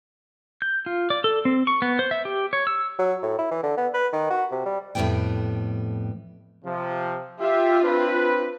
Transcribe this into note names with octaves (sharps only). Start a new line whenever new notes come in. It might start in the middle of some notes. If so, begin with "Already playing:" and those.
G6
F4
D5
A4
C4
C#6
B3
C5
E5
G4
C#5
E6
F#3
A2
E4
E3
D3
B3
B4
D#3
F#4
C3
G3
F2 A2 F#3 G3 B3 G5
C3 F3
F4 G4 E5
C4 D4 B4